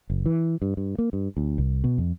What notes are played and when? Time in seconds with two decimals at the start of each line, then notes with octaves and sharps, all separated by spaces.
0.10 F#1
0.26 E3
0.62 G2
0.77 G2
0.98 A#3
1.13 G2
1.37 D2
1.58 C2
1.84 B2
1.98 F2